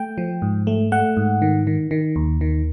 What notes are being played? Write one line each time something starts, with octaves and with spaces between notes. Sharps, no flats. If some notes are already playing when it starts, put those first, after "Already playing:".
Already playing: A3 G5
F3
G#2
A3
A3 F#5
G#2
D#3
D#3
D#3
D#2
D#3